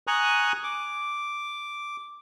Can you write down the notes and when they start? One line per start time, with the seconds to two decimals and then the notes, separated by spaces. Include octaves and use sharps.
0.07 G#5 A#5 C#6 D#6 F#6
0.64 D6